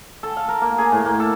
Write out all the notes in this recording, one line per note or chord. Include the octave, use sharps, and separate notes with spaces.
A4
F5
A#4
A#3
G#4
A2
A#3
A4